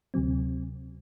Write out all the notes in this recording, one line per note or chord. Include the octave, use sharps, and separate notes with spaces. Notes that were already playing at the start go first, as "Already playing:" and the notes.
D2 C3 F#3 C4